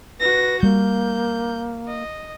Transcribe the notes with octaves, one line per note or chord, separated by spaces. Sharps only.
F#4 B4 A#6
G3 A#3 G6
D#5